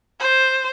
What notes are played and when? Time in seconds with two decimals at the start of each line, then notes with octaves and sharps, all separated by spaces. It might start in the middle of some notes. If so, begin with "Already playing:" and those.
0.20 C5